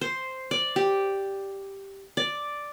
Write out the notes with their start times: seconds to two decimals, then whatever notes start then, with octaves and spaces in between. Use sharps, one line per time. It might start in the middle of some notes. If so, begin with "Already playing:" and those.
0.01 C5
0.51 D5
0.76 G4
2.17 D5